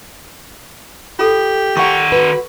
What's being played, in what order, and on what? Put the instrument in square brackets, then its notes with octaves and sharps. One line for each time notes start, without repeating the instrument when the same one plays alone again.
[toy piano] F4 A4 [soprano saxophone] G4
[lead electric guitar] D#3 F#5 [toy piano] C#6
[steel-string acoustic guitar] F#4 B4